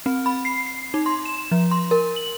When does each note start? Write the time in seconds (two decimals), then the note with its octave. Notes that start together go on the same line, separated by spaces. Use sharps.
0.06 C4
0.26 B5
0.45 C7
0.66 C7
0.94 D#4
1.06 C6
1.25 E7
1.52 F3
1.71 C6
1.91 A#4
2.16 F#7